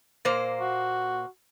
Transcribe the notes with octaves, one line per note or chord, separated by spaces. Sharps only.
A#2 A#3 C5
F#4